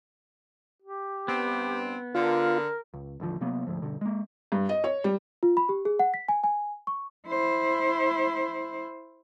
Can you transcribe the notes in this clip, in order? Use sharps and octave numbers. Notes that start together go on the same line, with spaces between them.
G4
G2 B3 C4
D3 F4 A#4
C#2
A1 D#2 D3 F3
C3 F#3 A#3 B3
D2 G#2 F3
G2 B2 D3
G#3 A#3
G2
D#5
C#5
G3
F4
B5
G4
G#4
F#5
B6
G#5
G#5
C#6
E4 C5